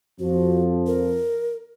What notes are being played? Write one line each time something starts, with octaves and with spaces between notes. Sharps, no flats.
F2 F3 F#4
A#4